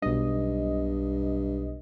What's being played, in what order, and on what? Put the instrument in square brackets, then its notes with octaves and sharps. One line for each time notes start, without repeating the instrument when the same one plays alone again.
[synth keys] B1 D#5 [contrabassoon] G2